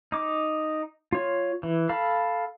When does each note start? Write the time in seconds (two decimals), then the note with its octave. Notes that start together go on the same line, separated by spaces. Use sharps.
0.12 D#4 D6
1.13 F4 C#5
1.63 E3
1.89 A4 F5 B5